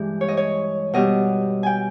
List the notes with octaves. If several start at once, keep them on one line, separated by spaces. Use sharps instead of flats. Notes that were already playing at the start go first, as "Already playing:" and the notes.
Already playing: G2 E3 G#3 G4
C#5
D#5
C#5
B2 G3 D#5
G5 G#5